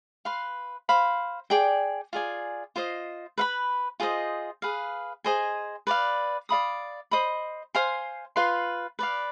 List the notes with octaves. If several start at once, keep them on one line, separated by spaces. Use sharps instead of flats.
B4 F5 C6
C5 F5 B5
G#4 D5 G5
F4 G#4 D5 G#5
F4 C5 D#5
B4 F5 B5
F4 G#4 C5 D#5
G#4 B4 F5
G#4 C5 D#5 G#5
B4 D5 F5
D5 F5 B5 D#6
C5 D#5 B5
C5 F5 G#5 C6
F4 B4 F5 C6
B4 D5 F5